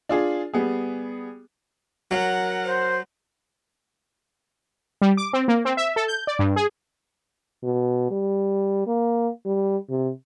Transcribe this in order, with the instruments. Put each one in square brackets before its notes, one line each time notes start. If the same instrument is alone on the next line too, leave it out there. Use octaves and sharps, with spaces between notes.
[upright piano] D4 F4 G#4
G3 B3 G#4
[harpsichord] F#3 [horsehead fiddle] A#4 F#5
[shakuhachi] C5
[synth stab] G3
D6
C4
A#3
C4
E5
A4
G6
D5
G2
G#4
[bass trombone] B2
G3
A#3
G3
C3